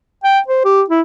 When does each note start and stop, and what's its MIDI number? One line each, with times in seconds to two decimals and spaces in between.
0.24 0.40 79
0.48 0.61 72
0.65 0.82 67
0.90 1.01 64